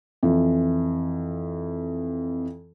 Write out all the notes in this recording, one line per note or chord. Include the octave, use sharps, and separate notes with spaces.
F2 E3